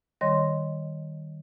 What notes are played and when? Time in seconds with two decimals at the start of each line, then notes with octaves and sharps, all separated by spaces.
0.21 D#3 G3 C#5 D#5 C6 A#6